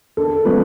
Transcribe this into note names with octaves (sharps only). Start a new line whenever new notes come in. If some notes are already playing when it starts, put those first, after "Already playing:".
D3 A4
F3 G#3 C#4 B4